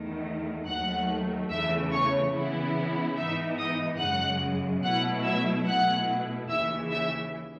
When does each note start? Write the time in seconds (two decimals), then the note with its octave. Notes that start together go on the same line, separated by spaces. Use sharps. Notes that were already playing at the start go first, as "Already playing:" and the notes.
Already playing: E2 D#3 A3
0.67 D#2 D#3 F#3 A3 F#5 F#6
1.50 E2 C#3 E3 A3 E5 E6
1.92 C#5 C#6
2.34 C#3 E3 B3 E4
3.16 G#2 E3 B3 D#4 E5 E6
3.58 D#5 D#6
4.00 F#2 C#3 G#3 F#5 F#6
4.83 B2 F#3 A3 E4 F#5 F#6
5.24 E5 E6
5.66 B2 A3 E4 F#5 F#6
6.49 D#2 C#3 E3 E5 E6
6.91 E5 E6